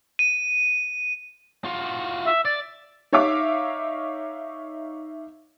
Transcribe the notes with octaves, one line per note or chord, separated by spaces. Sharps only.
D#7
F4 F#4
E5
D5 A6
D#4 C#5 E5 F5 D6